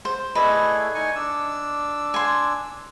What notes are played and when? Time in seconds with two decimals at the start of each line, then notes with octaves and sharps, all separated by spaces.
0.05 C5
0.35 A3 E4 G#4 B4 D5 D#5
0.95 D#4 G#5 C#6
1.16 D4 E6
2.14 G#5 C6